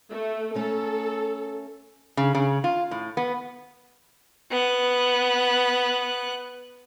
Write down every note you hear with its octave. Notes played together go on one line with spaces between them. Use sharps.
A3
A3 C#4 A4 A#4
C#3
C#3
F4
A2
B3
B3 F#6